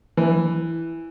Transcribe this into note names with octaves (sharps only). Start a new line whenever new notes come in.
E3